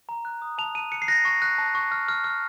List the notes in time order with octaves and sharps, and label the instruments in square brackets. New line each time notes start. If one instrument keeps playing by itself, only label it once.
[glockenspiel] A#5
F#6
D#6
A5 F7
A5 D#7
F#6 C#7
C7
F#6 A#6
C#6
F#6
A5
C#6
F6
F6
F6